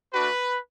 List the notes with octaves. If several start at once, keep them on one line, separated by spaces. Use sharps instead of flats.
A3 D4 F#4 B4